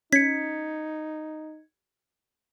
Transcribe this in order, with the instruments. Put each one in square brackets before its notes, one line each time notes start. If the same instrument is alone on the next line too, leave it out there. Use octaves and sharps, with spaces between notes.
[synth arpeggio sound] C#4 [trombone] D#4 [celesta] G#6 C#7 [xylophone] B6